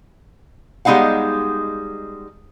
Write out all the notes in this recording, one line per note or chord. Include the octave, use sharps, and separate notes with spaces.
G3 G#3 B3 D#4 F5 F#5